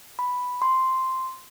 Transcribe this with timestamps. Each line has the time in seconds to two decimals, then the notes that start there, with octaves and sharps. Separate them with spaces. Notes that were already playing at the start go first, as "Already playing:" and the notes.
0.19 B5
0.62 C6